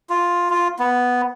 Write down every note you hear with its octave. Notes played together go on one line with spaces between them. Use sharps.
F4
F4
B3